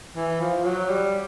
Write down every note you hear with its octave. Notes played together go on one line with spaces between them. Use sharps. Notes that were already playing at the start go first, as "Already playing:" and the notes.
E3
F3
F#3
G3